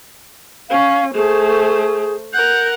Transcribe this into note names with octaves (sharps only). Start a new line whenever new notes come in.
C#4 F5
A3 G#4 C5
A#4 F#5 G6